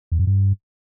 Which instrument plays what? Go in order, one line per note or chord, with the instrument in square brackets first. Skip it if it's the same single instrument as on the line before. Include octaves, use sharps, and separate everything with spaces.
[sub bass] E2
F#2
G2